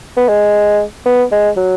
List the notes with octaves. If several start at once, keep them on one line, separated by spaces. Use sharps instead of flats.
B3
G#3
B3
G#3
F#3